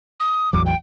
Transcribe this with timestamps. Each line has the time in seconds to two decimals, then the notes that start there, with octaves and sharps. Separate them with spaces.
0.20 D#6
0.53 A1 E2 F#3 D6
0.66 G5